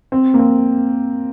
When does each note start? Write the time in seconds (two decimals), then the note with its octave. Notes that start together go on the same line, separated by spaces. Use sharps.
0.12 C4
0.34 A#3
0.39 C4